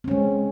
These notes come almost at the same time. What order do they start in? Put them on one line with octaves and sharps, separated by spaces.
C4 C#4 G#3